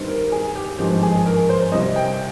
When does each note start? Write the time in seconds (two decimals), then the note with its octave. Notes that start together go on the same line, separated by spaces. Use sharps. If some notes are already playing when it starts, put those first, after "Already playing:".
Already playing: G2 D#3 G3 C4
0.08 A#4
0.32 G#4
0.55 G4
0.78 G#1 G2 F3 G#3 C4 G4
1.03 G#4
1.26 A#4
1.49 C5
1.72 C2 C3 G3 C4 D#5
1.96 G5